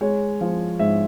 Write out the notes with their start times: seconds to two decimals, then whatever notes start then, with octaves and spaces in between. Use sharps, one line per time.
0.01 G#3 C#5
0.41 F3
0.79 G#2 E5